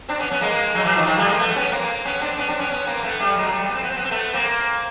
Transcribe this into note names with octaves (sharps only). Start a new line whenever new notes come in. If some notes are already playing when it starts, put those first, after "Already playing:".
C4 D4
B3 C#4
B3 C#4
G#3 A#3
F#3 G#3
E3 F#3
D#3 F3
D#3 F3
G3 A3
G#3 A#3
A3 B3
B3 C#4
A#3 C4
B3 C#4
C4 D4
B3 C#4
C4 D4
B3 C#4
B3 C#4
A#3 C4
A3 B3
G3 A3
F#3 G#3
A#3
G3 A3
B3
C4
B3
C4
B3
C4
A3 B3
A#3 C4